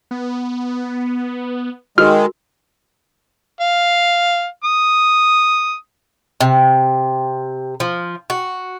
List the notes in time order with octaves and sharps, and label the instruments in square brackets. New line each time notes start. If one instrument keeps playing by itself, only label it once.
[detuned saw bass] B3
[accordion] D#3 G#3 [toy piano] F#4 A4 A#4 [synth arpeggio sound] F6
[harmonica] F5
D#6
[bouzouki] C3
F3
F#4